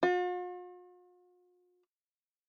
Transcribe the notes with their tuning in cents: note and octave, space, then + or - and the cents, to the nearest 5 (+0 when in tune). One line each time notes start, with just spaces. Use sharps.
F4 +45